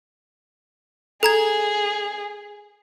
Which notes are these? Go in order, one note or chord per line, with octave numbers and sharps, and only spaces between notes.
G#4 A4 A#5 G#6